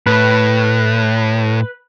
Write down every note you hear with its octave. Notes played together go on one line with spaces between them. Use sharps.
A2 B4